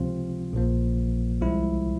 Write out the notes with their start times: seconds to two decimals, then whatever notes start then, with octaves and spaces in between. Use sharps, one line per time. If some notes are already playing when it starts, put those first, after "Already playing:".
Already playing: C#2 C3 F3 C4 F4
0.53 A#1 A#2 F3 A#3
1.41 C2 C3 F3 G#3 E4